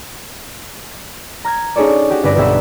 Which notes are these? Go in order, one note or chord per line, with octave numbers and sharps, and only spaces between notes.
A#5 F6 G#6
C#4 D#4 G#4 A4 C#5 D5
F#4 G4
G1 C4 B4 D5 A#6 D7
B1 G4 B4 E5 B5 C6